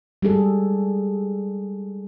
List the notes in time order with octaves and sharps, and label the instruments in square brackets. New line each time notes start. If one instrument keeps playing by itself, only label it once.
[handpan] G3 G#3 G#4 A4